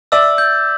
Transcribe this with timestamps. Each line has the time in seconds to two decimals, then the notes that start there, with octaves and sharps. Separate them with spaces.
0.12 D5 E5 E6
0.38 G6